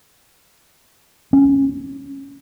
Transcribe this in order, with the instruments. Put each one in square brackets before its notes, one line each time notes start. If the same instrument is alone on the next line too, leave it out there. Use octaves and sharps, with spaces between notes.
[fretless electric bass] C#4